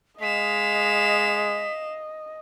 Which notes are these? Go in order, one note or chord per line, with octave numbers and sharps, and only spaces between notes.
G#3 D#5 F5 B6 E7